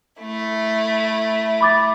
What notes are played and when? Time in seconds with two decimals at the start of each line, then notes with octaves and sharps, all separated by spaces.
0.20 A3 E4
1.61 B5 D6 A6